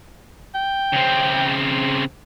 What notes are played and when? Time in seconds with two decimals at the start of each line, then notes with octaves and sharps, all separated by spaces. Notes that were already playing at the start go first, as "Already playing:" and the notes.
0.55 G5
0.93 C#3 C4